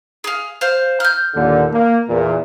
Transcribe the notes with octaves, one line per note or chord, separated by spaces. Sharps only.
G#4 F5
C5 F5
F6 G6
D#2 A#2 D3
A#3
E2 A#2